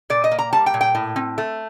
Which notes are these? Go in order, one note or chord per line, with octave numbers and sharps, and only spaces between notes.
A#2 D5
D#5
A#3
A#5
G3 A5
G5
A#2
G5
A2
C4
A3